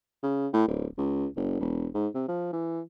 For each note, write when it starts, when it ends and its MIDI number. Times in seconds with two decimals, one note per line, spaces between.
0.23 0.48 49
0.53 0.65 45
0.68 0.86 26
0.98 1.27 37
1.36 1.59 30
1.60 1.87 28
1.94 2.08 44
2.14 2.24 48
2.28 2.49 53
2.53 2.81 52